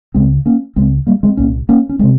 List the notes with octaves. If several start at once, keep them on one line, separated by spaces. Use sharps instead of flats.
C#2 C#3 G#3 C4
A#3 C#4
C#2 C#3 G#3 C4
G3 A#3
G#3 C4
C2 A#2 A#3 C#4
A#3 C#4
C#4
C3 G#3 C4